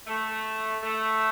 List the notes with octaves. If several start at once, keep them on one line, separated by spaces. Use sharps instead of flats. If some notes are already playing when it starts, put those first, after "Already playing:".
A3
A3